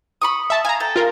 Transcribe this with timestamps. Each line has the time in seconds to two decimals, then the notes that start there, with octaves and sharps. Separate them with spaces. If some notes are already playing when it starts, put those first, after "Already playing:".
0.21 B5 C#6 D#6
0.50 E5 A5
0.65 F5 G#5 A#5
0.80 A4 G5
0.96 F4 A#4